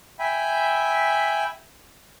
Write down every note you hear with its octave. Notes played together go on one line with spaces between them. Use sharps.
E5 G5 G#5 B5